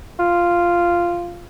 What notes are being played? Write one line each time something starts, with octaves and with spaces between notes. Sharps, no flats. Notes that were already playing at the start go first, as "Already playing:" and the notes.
F4